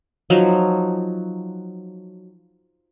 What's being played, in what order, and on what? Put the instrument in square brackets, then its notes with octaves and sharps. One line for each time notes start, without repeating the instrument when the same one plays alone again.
[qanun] F3 F#3 D#4